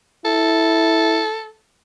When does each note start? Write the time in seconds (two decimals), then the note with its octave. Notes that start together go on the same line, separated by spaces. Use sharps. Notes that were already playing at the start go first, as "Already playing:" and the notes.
0.25 E4 A4